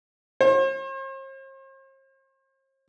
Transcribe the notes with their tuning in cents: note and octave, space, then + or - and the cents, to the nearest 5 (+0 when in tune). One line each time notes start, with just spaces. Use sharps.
C5 +45